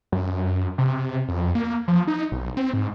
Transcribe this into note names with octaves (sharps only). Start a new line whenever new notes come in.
F#2
C3
F2
A#3
F3
D#4
B1
C4
G#2